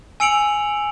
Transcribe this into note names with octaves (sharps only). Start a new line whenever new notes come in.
G#5 E6 C#7 D7 F7 F#7